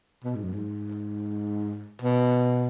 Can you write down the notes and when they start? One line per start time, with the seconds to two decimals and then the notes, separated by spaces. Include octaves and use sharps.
0.24 B2
0.35 G#2
0.44 F#2
0.54 G#2
2.02 B2